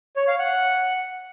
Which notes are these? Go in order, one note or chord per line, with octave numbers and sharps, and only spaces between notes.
C#5
F5
F#5